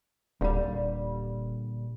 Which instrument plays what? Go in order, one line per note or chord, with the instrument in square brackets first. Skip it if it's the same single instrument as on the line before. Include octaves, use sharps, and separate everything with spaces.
[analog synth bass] D#1 [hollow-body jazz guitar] A#2 D3 G3